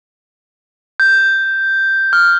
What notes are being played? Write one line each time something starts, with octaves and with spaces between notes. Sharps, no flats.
G6
F6